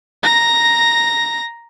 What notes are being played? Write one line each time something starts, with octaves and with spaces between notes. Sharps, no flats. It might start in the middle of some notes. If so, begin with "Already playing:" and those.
A#5 A#6